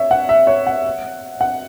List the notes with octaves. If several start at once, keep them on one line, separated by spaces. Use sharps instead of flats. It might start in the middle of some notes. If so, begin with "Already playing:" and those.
Already playing: C#5 E5
F#5
E5
C#5
F#5
F#5